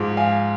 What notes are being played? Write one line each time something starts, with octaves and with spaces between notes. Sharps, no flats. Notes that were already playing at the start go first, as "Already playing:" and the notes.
Already playing: G#2 F3 G#3
F5 G#5